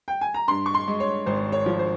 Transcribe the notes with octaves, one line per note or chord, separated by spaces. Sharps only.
G5
G#5
A#5
G2 C6
C#6
C6
G#3
C#5
G#1 C5
C#5
F3
C5